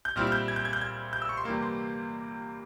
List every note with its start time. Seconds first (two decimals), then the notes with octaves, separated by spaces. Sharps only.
0.05 G6
0.16 A#2 G3 C4 E4 F6
0.27 F6
0.32 G6
0.48 G#6
0.56 G6
0.65 G#6
0.73 G6
0.81 G#6
1.13 G6
1.22 E6
1.29 C#6
1.37 C6
1.45 C3 E3 G3 A#3
1.62 C6